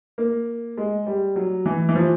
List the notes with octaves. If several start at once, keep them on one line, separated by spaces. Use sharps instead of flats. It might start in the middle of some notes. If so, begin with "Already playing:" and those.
A#3
G#3
G3
F#3
E3
E3
F3